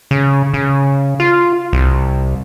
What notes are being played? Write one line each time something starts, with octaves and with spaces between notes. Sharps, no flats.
C#3
C#3
F4
C2